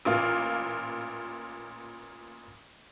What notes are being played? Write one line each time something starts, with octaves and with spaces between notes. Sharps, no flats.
A1 A#2 F4